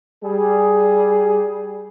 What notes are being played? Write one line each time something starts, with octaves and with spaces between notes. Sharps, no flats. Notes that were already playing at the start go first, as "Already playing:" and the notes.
G3 G#4